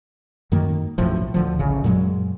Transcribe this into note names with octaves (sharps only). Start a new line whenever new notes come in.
F#2 D#3 A#3
B1 F#2 A2 F3
D2 D3 F3
A1 C#3
F#2 A#2 F#3 G#3